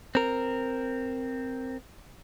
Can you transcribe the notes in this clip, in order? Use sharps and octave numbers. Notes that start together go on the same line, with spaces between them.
C4 A#4